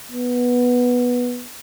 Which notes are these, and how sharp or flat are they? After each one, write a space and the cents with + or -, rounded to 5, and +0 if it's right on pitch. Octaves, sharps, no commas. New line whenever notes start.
B3 -10